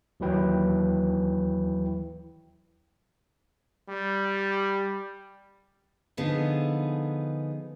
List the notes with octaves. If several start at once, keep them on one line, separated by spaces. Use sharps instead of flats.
D#2 E3 F#3 E4 B4 G5
G3
D3 F3 B3 D#4 F4 G#4